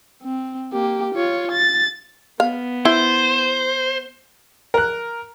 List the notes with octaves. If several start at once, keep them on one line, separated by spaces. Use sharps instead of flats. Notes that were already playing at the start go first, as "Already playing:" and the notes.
C4
A#3 G4
F4 C#5
A6
B3 F5
E4 C5
A#4 F#6